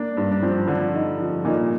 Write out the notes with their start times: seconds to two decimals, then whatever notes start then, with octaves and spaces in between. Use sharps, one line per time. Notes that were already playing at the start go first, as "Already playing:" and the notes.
Already playing: A#3 D4
0.17 G2
0.32 D4
0.42 F3 C4
0.68 D3 F3
0.94 D#4
1.20 F3
1.45 A#2 D#4